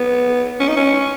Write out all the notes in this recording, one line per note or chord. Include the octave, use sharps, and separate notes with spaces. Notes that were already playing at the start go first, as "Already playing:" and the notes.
Already playing: B3
C#4
D#4
C#4